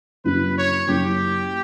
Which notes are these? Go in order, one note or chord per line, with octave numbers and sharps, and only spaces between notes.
F#2 C#3 F#3 A#3 E4 B4
C#5
F#2 C#3 F#3 A#3 E4 G4